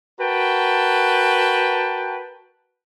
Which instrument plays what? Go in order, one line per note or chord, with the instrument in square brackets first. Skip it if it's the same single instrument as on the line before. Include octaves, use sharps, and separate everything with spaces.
[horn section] F#4 A#4 B4 G5 A5